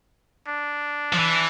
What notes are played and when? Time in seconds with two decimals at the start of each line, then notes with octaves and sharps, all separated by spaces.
0.48 D4
1.13 F3
1.19 E3